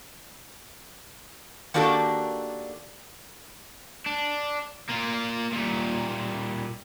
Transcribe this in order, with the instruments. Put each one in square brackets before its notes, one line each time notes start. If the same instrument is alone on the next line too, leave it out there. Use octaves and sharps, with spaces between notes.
[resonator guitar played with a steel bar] D#3 A#3 D4 F#4 G4 A4
[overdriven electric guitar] D4
A#3 F4
A#2 G3